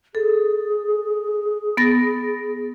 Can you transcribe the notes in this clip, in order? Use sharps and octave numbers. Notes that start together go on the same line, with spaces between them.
G#4 A4
B3 A6 A#6